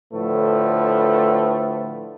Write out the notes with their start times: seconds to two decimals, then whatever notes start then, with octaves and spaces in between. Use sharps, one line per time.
0.13 A2 D3 F3 A3 B4